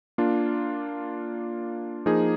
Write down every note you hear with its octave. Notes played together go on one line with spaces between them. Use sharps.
A#3 D4 F4
F3 A#3 D#4 G#4